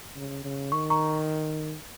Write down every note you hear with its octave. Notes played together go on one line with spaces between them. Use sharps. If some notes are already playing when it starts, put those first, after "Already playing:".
C#3
C#3
D#3 C#6
A#5 C#6